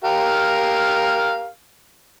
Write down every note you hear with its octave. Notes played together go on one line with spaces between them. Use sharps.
G4 A#4 F5